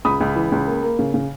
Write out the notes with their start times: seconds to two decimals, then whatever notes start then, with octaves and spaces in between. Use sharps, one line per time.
0.05 C#2 B5 D#6
0.21 C#2
0.36 E3
0.52 C#2
0.67 A#3
0.83 A#3
0.99 C#3
1.14 C#3